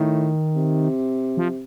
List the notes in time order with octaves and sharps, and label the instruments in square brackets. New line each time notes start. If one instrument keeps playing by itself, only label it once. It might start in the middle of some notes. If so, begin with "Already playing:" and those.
Already playing: [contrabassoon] A2 [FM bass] D#3
[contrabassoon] C3
[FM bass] F3